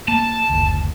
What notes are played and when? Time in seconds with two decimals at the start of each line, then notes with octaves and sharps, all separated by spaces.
0.08 A#3 A5
0.50 F#1 D2